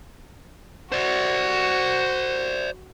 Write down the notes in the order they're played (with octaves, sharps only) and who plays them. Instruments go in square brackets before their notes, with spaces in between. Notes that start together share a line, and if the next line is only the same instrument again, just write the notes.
[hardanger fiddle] F#4 [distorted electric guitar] C5 D5